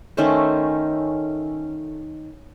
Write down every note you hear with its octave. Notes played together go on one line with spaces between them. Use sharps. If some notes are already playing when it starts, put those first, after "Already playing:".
D#3 A3 C#4 C5